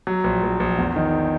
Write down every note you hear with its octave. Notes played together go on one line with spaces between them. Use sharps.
F#3
A#1
A#1
A#1
E2
D#3